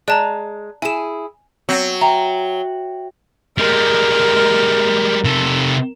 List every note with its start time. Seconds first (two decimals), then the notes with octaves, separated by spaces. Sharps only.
0.08 G#3 D5 A5 A#5
0.82 E4 G#4 G#5 E7
1.69 F#3 C4
2.01 E5 G5 A#5
3.58 G3 G#3 A#4
5.25 C3 A4